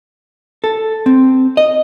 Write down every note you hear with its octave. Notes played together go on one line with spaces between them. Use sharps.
A4
C4
D#5